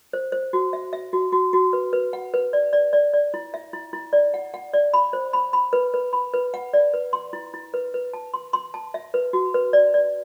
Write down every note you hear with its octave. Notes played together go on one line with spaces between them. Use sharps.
C5
C5
F#4
E5
E5
F#4
F#4
F#4
B4
B4
F#5
B4
D5
D5
D5
D5
E4
E5
E4
E4
D5
F#5
F#5
D5
B5
C5
B5
B5
B4
B4
B5
B4
F#5
D5
B4
C6
E4
E4
B4
B4
A5
C6
C6
A5
E5
B4
F#4
B4
D5
D5